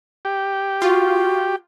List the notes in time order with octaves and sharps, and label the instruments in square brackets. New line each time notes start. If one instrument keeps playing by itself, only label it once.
[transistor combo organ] G4
[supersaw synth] F4 [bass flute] F#4